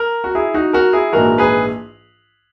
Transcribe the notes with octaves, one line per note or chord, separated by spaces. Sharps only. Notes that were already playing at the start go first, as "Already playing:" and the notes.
Already playing: A#4
F#4
E4 G#4
D#4 F#4
F#4 A#4
E4 G#4
A#1 G#2 E3 F#4 A#4
G#4 B4